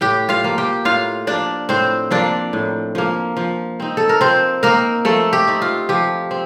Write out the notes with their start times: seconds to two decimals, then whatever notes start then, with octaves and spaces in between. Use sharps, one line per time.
0.01 A2 G4 G5
0.29 F4 F5
0.44 F3 A#3
0.58 G4 G5
0.85 A2 F4 F5
1.27 F3 A#3 D4 D5
1.69 A2 C4 C5
2.11 F3 A#3 D4 D5
2.53 A2
2.95 F3 A#3
3.37 F3
3.80 C4 D#4
3.97 A4
4.09 A#4
4.21 F3 C4 C5
4.63 A#3 C4 D#4 A#4
5.05 F3 A3 A4
5.33 G4
5.48 C4 D#4
5.62 F4
5.89 F3 G4
6.31 C4